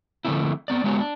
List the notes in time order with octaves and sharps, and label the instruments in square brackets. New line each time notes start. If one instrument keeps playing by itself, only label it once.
[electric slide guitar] D3 F3 A3 A#3 C4 E4
B3 C4 D5
G#3 B3 F#4 C#5
D4